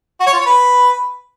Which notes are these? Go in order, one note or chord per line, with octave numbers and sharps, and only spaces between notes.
F#4
C#5
F4
C#5
B4